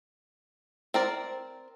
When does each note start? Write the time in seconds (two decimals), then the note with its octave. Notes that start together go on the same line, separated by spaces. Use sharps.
0.94 C4 A#4 D5